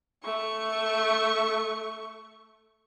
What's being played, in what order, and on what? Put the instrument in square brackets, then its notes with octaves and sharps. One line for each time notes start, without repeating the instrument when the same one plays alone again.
[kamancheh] A3 C#6